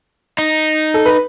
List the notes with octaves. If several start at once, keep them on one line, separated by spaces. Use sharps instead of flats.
D#4
A4
B4